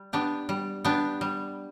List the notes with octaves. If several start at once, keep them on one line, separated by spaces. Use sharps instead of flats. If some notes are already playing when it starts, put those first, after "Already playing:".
Already playing: G3
B3 D4 G4
G3
B3 D4 G4
G3